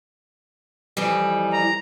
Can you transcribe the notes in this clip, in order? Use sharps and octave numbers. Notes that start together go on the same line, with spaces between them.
F2 E3 G3
A#5